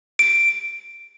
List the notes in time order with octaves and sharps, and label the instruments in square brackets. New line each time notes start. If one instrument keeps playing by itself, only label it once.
[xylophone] D7